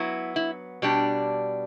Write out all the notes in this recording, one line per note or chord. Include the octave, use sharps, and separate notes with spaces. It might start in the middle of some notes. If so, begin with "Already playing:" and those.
Already playing: F#3 B3 E4
E4
B2 G3 D4